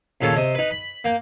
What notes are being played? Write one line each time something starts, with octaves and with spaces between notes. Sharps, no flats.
D#2 A#2 C#3 A4 C#5 C#6
C3 D#5 C6
D#4 B4
B5
A#3 G5